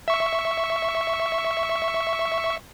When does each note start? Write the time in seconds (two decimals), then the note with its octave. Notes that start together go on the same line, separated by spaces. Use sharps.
0.08 E5 C#6